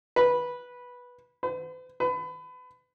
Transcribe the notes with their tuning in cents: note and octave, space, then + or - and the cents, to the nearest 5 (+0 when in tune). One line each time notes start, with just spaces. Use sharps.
B4 -10
B4 +45
B4 +30